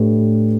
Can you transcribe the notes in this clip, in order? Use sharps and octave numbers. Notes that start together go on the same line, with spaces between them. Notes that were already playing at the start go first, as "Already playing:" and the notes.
Already playing: A2 A3 D4 G4 B4